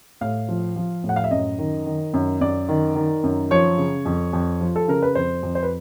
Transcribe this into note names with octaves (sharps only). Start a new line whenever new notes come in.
A2 F5
F3
F3
A2
F#5
F5
E5
F#2 D#5
D#3
D#3
F#2
F#2 D5
D#3
D#3
F#2
F3 C#5
C#3
F2
F2
F3
A4
C#3 A#4
B4
F2 C5
F2
C5
B4